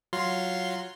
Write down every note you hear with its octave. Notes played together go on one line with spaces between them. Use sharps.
F#3 F4 C6